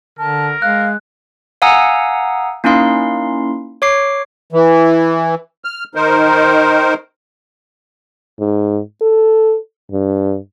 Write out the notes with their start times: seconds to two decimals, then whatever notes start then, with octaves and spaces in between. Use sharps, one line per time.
0.19 D3 A#4 A5
0.62 G#3 F5 F#6
1.62 F5 F#5 G#5 A#5 D#6 E6
2.64 A#3 C#4 D#4 E4 F5 C6
3.82 C#5 D6 C7
4.52 E3
5.64 F6
5.95 D#3 D#4 A#4 C5
8.39 G#2
9.02 A4
9.92 G2